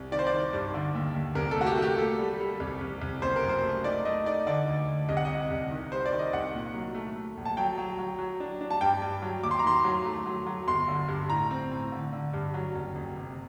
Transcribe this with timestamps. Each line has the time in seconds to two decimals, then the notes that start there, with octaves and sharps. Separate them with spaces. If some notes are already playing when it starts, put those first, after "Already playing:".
Already playing: C2
0.12 D#3 D5
0.19 C5
0.27 D5
0.32 D#3
0.53 G2
0.74 D3
0.95 D#2
1.15 D#2
1.35 C2 A#4
1.51 A4
1.56 A3 F#4
1.66 G4
1.77 A3 G4
1.98 A#3 A4
2.19 G3
2.40 G3
2.60 C2
2.81 C2
3.02 C2
3.22 F#1 C5
3.36 A#4
3.43 F#2
3.49 C5
3.63 A3
3.84 D#4 D5
4.05 A3 D#5
4.26 D#4 D5
4.47 D3 D5
4.68 D2
4.88 D2
5.09 C2 D#5
5.17 F#5
5.25 C3 D#5
5.51 C2
5.71 D#3
5.92 G3 C5
6.06 D5
6.12 D#3
6.19 D#5
6.33 C2 F#5
6.54 A#2
6.74 F#3
6.95 A3
7.16 A3
7.37 A#1
7.45 A5
7.57 F#3 G5
7.78 F#3
7.99 F#3
8.19 F#3
8.40 D4
8.61 D4
8.70 A5
8.81 G2 G5
9.02 G2
9.22 F#3
9.43 D#2 D6
9.51 C6
9.59 A#5
9.64 D#3 C6
9.85 F#3
10.06 A3
10.26 F#3
10.46 F#3
10.67 G1 C6
10.88 D3
11.08 G2
11.30 A2 A#5
11.51 C4
11.71 A2
11.92 D3
12.13 D3
12.33 G2
12.54 F#3
12.75 F#1
12.95 F#1
13.16 C3